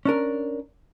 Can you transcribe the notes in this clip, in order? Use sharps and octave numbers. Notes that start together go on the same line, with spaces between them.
C#4 D4 A#4